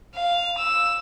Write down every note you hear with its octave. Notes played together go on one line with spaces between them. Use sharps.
F5
E6